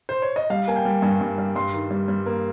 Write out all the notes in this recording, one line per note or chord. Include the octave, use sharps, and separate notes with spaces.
C5
C#5
D#5
G3 F5
A#3 G#5
G5
G3
G2 G#5
G2
G3
G2 C6
D#3
G3
G3
A#3